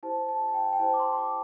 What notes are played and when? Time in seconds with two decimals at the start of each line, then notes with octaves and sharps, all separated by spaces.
0.03 E4 G4 C5 A5
0.28 A5
0.48 A5
0.54 G5
0.73 G5
0.79 E4 G4 C5 A5
0.94 D6
0.99 C6
1.12 C6
1.18 D6